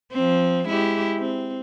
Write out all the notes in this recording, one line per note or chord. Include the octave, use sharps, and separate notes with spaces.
F3 C4
G#3 E4 G4
C4